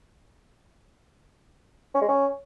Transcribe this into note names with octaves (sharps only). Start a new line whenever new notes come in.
C#4
G#3
C#4